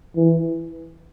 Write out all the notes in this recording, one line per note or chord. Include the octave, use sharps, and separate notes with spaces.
E3